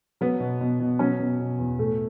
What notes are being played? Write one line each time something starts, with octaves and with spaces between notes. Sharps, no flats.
F#3 B3
B2
B2
B2
F#3 C#4
B2
B2
E2
A2 A3